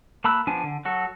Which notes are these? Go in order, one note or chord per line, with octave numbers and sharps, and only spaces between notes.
A#3 A5 B5 E6 F#6
F3 B3 D4 G#5
D3
F#3 F#4 A4